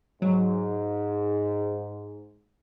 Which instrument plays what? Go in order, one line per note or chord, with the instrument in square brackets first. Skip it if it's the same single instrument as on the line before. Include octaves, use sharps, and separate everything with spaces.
[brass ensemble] G#2 [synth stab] F#3